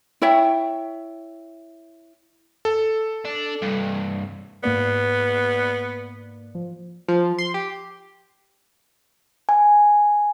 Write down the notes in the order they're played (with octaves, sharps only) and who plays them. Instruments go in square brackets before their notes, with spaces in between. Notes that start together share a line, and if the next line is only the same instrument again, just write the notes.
[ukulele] E4 C#5 E5 G5
[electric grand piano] A4
[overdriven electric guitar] D4
C2 G2
[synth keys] G#2 A#3 D5 [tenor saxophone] B3
[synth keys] F3
F3
C6
G4
[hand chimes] G#5